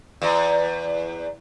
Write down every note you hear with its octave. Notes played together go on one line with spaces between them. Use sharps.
E2